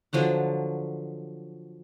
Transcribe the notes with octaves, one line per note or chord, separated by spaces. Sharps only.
D3 F3 F#3 F#5